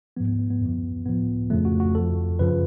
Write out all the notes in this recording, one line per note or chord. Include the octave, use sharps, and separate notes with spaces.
G#2 F3 B3
B3
B3
B3
F#2 D3 F3
A2 F3 B3
F2 C#3 F3 A3
F#4
F#4
F2 F3 A4
F#2 C#3 F3 B4